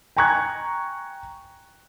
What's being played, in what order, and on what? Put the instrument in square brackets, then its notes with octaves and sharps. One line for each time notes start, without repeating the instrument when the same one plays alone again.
[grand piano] G5 G#5 A#5 C#6 F#6 G#6